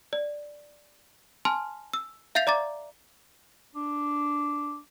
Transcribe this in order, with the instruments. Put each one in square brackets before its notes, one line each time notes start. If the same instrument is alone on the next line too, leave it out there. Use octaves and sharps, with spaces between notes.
[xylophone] D5
G#5 A5 C6 F6
E6
E5 F5 G6 A6 C7 F7
D5 A#5 D6 A6
[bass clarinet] D4